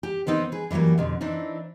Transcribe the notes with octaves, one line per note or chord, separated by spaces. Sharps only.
G4
D#3 B3 C4 D#4
G#4 B4
D3 E3 F#3 G3 A#3
F2 B2 D3
E3 C4 D4 D#4